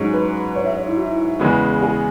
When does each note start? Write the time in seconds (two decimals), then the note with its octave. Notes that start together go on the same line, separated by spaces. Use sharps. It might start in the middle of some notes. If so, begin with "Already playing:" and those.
Already playing: G#2 F#3 C#4 G#4
0.13 B4
0.56 C#5
0.66 E5
0.77 C#5
0.87 E4
0.97 F#4
1.40 E2 C#3 G#3 B3
1.82 G#4